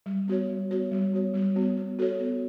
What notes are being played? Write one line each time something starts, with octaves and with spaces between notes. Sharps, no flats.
G3
B3 F#4 C#5
G3
B3 F#4 C#5
G3
B3 F#4 C#5
G3
B3 F#4 C#5
B3
F#4 A4 C#5
B3